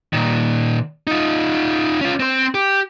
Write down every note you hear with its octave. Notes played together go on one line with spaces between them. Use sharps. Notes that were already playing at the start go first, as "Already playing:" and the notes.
A#2 D#3
D#4 F4
C#4 F4
C4 C5
G4